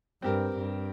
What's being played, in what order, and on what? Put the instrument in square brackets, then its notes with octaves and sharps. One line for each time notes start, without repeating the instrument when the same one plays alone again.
[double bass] G2 [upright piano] C4 G4 A#4
[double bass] G2